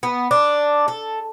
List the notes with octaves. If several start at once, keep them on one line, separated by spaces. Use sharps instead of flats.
B3
D4
A4